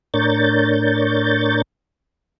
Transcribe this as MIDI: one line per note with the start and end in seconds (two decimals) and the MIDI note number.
0.14 1.62 45
0.14 1.62 62
0.14 1.62 70
0.14 1.62 73
0.14 1.62 91
0.14 1.62 93